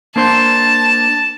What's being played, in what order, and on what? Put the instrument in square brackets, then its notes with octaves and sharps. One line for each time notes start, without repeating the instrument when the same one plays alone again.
[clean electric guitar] A#3 D4 C5 [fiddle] A5